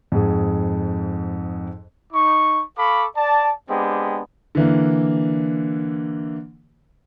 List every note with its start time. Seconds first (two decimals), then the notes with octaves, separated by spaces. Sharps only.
0.12 F2 G#2 G#4
2.13 D#4 C#6
2.77 A4 F5 B5 C#6 D6
3.16 D5 A5
3.69 G#3 B3 C4 D4 G4
4.55 D3 E3 A#3